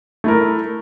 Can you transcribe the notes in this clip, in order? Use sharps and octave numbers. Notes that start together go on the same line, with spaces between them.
A3 E4 A#4